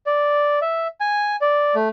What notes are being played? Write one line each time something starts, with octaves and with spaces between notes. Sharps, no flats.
D5
E5
G#5
D5
A3